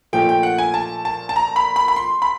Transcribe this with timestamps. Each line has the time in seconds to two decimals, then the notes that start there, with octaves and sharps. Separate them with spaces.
0.13 A#2 F3 A3 G5
0.29 G5
0.43 F#5
0.58 G#5
0.74 A5
1.05 A5
1.29 A5
1.36 A#5
1.56 B5
1.76 B5
1.88 B5
1.96 C6
2.22 B5